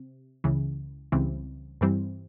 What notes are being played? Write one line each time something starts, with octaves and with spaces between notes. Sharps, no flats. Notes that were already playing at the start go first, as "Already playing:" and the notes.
Already playing: C3
C#2 C#3 E3
C#2 C#3 E3 G3 C4
G2 E3 G3 C4